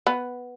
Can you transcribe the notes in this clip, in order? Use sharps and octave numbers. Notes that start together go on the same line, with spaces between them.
B3